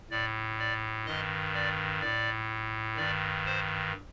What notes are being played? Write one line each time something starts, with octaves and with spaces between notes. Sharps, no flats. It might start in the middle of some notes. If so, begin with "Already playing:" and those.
A2 D5
D5
G2 D#3 D#5
D5
A2 D5
G2 D#3 D5
C5